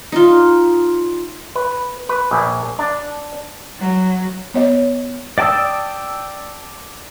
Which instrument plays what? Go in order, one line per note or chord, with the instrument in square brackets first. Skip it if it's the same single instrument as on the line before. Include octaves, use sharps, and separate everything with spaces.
[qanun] D#4 F4
[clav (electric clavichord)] B4
B4
A#1
D4
[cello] F#3
[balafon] B3 C#5 D#5
[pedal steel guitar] D5 G5 A5 D#6 E6